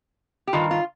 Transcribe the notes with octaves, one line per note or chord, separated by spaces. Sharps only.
G4
G2 D#3 F4
F4